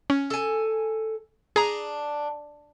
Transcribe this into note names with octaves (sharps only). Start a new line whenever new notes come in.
C#4
A4 G#5
D4 G#4 A#5